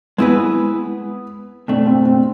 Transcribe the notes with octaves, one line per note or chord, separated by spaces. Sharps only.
G#3 B3 C4 E4 G#4 B4
B2 A3 C4 D4
C4
C4